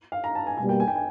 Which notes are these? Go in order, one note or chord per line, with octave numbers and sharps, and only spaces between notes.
F5
A#5
A5
G#5
B2 G3 A#3 G#5
G5
G#5
G5
G#5